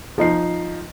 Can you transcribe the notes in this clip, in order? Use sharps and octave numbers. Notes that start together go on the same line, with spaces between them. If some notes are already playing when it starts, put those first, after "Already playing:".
F3 D#4 C7